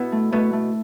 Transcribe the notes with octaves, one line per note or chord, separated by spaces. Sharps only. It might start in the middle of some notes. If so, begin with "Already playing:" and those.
Already playing: B2 B3 E4
A3
B2 A3 B3
A3